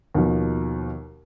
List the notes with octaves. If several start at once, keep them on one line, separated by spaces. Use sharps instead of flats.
D#2 B2 F3